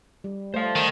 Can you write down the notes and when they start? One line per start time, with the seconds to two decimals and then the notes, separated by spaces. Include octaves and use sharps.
0.24 G3
0.54 A3 C5 F5
0.76 D#3